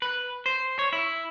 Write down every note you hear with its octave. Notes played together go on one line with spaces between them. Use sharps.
B4
C5
C#5
E4